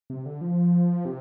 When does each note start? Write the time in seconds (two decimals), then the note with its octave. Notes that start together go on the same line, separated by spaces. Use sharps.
0.10 C3
0.26 D3
0.41 F3
1.05 C3